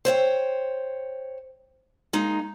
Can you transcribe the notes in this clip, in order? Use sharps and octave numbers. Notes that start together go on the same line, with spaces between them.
C5 C#5 E5 G5
G#3 A#3 D#4